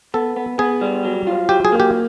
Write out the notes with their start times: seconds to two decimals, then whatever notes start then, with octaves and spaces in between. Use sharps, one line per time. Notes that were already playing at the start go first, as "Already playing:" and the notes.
0.14 B3 A4
0.37 B3
0.59 B3 G#4
0.81 G3
1.04 F#3
1.27 F4
1.49 F#3 G4
1.65 G#4
1.72 A#3
1.80 G4